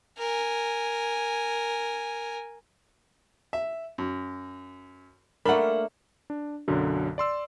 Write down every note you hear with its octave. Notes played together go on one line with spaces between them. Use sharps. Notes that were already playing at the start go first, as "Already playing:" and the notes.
A#4 G#5
E5
F#2
A3 A#3 D4 A#4 F#5 B5
D4
B1 F#2 D3 F#3
D5 C6 E6